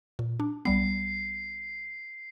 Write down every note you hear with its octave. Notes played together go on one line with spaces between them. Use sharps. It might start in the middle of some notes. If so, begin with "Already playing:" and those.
A#2
D4
B1 G3 B3 C7